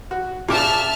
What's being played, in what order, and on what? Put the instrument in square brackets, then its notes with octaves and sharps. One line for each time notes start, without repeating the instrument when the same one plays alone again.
[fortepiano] F#4
[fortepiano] A#2 C#3 D6 [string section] E5 A5 F6